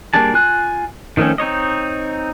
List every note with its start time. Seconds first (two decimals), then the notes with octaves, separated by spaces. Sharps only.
0.14 G3 A#3 D4 G#4 A5
0.34 F4 G#5 F#6
1.17 D#3 F3 A3 C4 C#4
1.38 C4 D#4 C#5 D#5